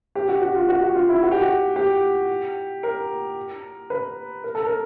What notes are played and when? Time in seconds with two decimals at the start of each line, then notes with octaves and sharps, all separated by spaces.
0.15 G4
0.28 F#4
0.42 F#4
0.55 F4
0.69 F#4
0.82 F#4
0.95 F4
1.09 E4
1.23 F#4
1.31 G4
1.41 F#4
1.76 G4
2.83 A#4
3.90 B4
4.44 A#4
4.55 A4
4.66 A#4